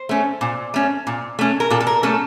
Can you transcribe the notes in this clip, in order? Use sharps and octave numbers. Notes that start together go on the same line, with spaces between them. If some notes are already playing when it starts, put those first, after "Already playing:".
Already playing: C5
A3 C#4
A#2
A3 C#4
A#2
A3 C#4
A#4
A#2 A4
A4
A#4
A3 C#4 A4